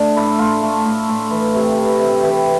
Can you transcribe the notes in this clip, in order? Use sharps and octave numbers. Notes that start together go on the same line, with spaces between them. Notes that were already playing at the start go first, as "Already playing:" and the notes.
Already playing: A3 D4
A2 E4
A2 F4
A3
A2
A2
E3
C3
E3
C3
E3 G4